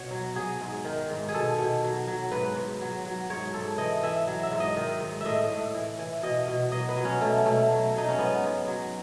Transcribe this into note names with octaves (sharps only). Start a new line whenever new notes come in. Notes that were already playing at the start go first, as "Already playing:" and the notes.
Already playing: B2 F#4 C#5
F#3
F#3 G#4
G#2
D#3
G#2
G#4
B2 A4
B2
F#3
F#3
G#2 B4
G#2
F#3
F#3
G#2 C#5
G#2 A4
E3 D#5
E3 E5
F#3
E5
G#2
D#5
D#3
G#2
A2 D#5 E5
A2
E3
E3
B2 D#5
B2
F#3 D#5
B4
F#3
C#4
B2 A3
B2 A3
F#3
F#3 D#4
C#4
G#2 B3
G#2
F#3